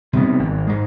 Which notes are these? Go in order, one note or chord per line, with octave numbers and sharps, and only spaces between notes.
C3 G3 B3
G#1
G#2 G#3